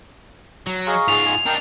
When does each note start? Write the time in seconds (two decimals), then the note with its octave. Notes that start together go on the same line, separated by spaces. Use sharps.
0.67 F#3
0.87 G#4 D#5 F5 A#5 C#6
1.08 G#2 F4 G#4 F7
1.26 G#5
1.46 D4 D#4 A#4 G5